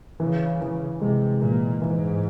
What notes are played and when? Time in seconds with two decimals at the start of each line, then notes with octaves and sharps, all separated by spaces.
0.20 C#3 E3
0.61 E3
1.01 C3 G#3
1.41 A#2 E3
1.82 G#2 E3